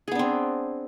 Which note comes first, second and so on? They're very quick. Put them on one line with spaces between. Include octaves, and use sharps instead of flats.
G#4 B3 D4 C4